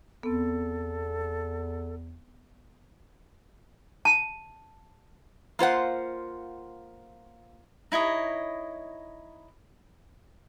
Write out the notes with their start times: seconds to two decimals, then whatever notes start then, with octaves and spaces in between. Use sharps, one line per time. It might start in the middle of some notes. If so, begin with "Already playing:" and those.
0.23 E2 B3 C4 A4
4.05 A5
5.59 A#3 F4 C5 F#5
7.92 D#4 E4 C#5 D#5